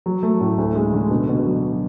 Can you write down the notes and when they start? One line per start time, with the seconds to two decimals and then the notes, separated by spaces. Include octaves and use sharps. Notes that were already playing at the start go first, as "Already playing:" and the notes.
0.06 F#3
0.23 A3
0.41 A2
0.58 D2
0.76 G#3
0.93 D3
1.11 B2
1.29 B2
1.46 F#3